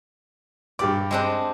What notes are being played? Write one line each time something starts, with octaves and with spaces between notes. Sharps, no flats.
G2 G4 D5 D6
G#3 C4 D4